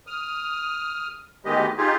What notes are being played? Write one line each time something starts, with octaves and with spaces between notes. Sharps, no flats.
D#6 F6
D2 D#3 G#3 B3 G4 D#5
D#4 F4 G4 G#4